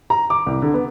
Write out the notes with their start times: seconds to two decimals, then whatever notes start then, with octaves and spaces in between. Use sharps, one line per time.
0.10 A#5
0.30 D6
0.46 C2
0.62 D3
0.74 B3